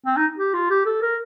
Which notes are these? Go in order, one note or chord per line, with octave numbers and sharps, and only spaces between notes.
C4
D#4
G4
F4
G4
A4
A#4